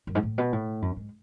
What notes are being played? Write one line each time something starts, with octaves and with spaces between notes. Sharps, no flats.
F#2
G#2
A2
B2
A2
F#2
G#2